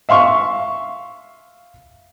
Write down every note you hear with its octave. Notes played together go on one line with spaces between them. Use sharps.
E5 F5 C6 C#6